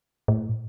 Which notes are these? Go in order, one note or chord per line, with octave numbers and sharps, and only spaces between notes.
A2